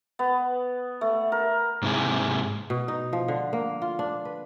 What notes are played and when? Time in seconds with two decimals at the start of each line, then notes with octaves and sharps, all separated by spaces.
0.19 B3
1.01 A3
1.32 A#4
1.82 G#2 C3 E4 G#4
2.70 B2
2.88 D#4
3.13 F3
3.28 D3
3.53 A#3
3.82 F4
3.99 D4
4.25 B4